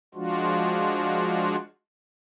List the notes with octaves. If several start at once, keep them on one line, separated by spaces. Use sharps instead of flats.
F3 G#3 D4 F4 F#4